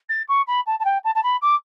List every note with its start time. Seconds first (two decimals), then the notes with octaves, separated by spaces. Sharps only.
0.09 A6
0.28 C#6
0.47 B5
0.66 A5
0.79 A5
0.84 G5
1.04 A5
1.15 A5
1.23 B5
1.42 D6